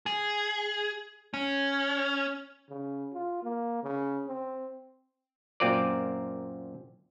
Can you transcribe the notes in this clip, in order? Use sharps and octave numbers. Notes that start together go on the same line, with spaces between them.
G#4
C#4
C#3
F4
A#3
C#3
C4
F#2 A#2 C4 F4 A#4 D5